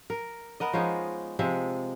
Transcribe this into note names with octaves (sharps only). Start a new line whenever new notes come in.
A#4
B3 A#4 D#5
F3 G#3 C#4 D#4
C3 F3 G#3 E5